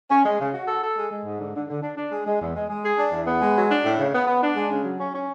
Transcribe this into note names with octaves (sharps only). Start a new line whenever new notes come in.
C#4
G#3
C#3
F#4
A4
A4
G#3
G#3
G#2
D3
D3
D3
D4
D4
G#3
G#3
E2
G#3
G#3
G#4
D4
E2
B3
G#3
F#3
D4
A2
C#3
B3
B3
D4
G#3
C#3
F#3
C#4
C#4